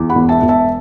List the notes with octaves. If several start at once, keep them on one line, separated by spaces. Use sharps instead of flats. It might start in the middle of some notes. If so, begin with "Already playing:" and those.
Already playing: E2
F#5 B5
E1
E5 A5
E1
E5 A5